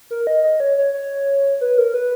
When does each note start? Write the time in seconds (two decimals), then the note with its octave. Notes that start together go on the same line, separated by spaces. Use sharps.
0.11 A#4
0.27 D#5
0.43 D#5
0.60 C#5
0.78 C#5
0.94 C#5
1.61 B4
1.78 A#4
1.94 B4